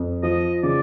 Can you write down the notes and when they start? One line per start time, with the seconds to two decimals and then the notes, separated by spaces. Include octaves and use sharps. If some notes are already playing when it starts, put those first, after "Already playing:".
Already playing: F2
0.23 F3 D#5
0.63 C#3 D5